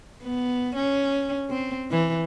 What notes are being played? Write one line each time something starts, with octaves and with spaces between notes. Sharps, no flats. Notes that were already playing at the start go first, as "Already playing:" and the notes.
B3
C#4
C4
E3